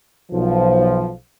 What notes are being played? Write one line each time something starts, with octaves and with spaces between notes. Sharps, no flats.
B1 F3